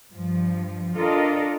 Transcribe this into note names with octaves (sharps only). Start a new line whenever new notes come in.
G2 F3
D4 F4 A4 A#4 D#5